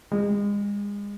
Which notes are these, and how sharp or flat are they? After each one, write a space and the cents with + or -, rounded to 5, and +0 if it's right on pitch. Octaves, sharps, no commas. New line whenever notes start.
G#3 -35